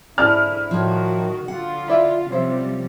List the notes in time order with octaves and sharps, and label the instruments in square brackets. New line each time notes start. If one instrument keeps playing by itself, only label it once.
[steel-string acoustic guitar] G#2 [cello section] D3 E4 [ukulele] D5 A5 [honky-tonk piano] F6
[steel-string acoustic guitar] A2 F3 [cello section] D#3 F#4
[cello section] D3 F4 [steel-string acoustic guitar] F#5
[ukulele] E4 D5 E5
[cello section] C3 F3 G3 [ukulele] C#4 C5 E5